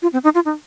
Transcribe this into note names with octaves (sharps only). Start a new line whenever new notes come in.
F4
C4
D#4
F4
D#4